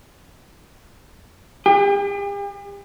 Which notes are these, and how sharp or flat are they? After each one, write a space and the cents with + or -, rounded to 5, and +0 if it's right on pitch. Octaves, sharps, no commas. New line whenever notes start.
G4 +45